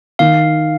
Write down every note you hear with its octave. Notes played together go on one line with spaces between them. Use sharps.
D#3 F5